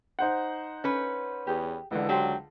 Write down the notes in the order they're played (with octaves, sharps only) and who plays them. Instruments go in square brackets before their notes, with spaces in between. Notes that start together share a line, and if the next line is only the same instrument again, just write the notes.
[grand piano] D#4 C5 F#5
[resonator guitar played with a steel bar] C#4 B4
[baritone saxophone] E2 [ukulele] G4 G#4
[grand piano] C#2 D3 [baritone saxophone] E3
[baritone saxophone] F#3 [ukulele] D4 G4 C5 [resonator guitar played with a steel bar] G5